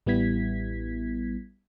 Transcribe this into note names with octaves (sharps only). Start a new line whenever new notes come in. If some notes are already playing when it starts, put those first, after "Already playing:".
A1 G3 B3 E4 G#6 B6